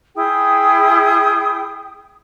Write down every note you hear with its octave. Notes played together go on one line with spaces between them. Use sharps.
E4 G#4 G5 D#6